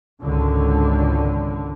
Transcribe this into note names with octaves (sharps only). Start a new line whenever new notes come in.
G#1 C#2 D3